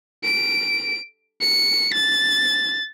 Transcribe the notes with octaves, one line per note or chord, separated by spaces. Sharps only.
D7
C#7
A6